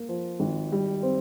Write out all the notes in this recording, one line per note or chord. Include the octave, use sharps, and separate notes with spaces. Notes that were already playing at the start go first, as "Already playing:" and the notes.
Already playing: A#3
F3
G#1
G3
C4